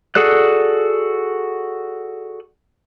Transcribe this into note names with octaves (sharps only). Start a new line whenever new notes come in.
F#4 G#4 A4 D5 F#6